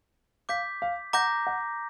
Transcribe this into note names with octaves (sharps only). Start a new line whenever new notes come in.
F5 D6 G6 B6
F5
F#5 A#5 D6 G6 A#6
F#5